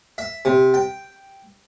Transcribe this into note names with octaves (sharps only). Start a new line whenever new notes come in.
E5
C3
G5